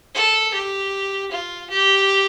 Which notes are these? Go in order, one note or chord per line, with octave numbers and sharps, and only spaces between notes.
A4
G4
F4
G4